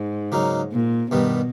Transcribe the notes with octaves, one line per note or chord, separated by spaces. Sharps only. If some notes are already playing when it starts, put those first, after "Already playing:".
Already playing: G#2
C#3 F#3 A#3 D#4
A#2
G2 B2 D#3 G3 B3